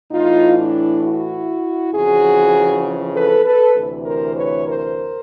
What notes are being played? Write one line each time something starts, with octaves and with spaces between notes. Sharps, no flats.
A2 E3 D#4 F4
D4 E4
E4 F#4
F2 C#3 E3 F#4 G#4
A4 B4
A4 B4
D2 C3 E3
A#4 C5
B4 C#5
A#4 C5